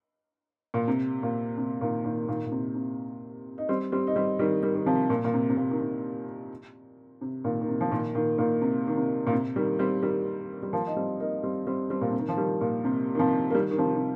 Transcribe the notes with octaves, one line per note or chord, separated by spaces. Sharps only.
A#2
C3
A#2
C3
A#2 D#3
A#2 D#3
A#2 D#3
A#2
C3
C3
D#4
G3 C4
G3 C4
D#4
G3 C4
D#3 G3
D#3 G3
D#3
C3 F3
A#2
A#2
C3
C3
A#2
D#3
C3
C3
A#2 D#3
D#3
C3
F3
A#2 D#3
A#2 D#3
A#2 D#3
C3
D#3
C3
A#2
C3
D#3 G3
G3 C4
D#3 G3
G3
F3 A#3
D#4
G3 C4
A#3 D#4
G3 C4
G3 C4
G3 C4
A#2
C3
D#3
F3
D#3 G3
A#2
C3
D#3
C3 F3
A#3
D#3 G3
D#3
C3 F3
C3